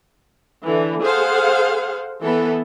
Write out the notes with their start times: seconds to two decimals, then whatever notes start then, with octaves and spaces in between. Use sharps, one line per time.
0.64 D3 E3
1.03 G#4 A4 C5 F5 F#5
2.21 E3 B3 A4 B4